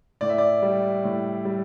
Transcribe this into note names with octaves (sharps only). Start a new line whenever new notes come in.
A2 D5
E5
D5
G3
A2
G3